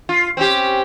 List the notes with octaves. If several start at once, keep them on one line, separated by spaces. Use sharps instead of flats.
F4
C4 C#4 G4